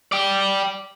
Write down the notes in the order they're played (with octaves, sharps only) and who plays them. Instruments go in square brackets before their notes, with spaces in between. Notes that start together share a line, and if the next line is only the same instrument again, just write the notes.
[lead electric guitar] D5 G5